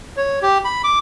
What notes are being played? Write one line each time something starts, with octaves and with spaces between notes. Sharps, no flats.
C#5
G4
B5
D6